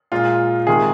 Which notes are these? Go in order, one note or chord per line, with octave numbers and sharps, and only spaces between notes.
A#2 G#3 F4
C3 D#3 G#3 G#4